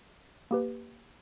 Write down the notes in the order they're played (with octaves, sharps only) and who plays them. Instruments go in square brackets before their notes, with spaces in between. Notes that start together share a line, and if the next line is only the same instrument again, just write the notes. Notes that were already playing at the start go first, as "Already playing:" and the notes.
[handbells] A#3 G4 B4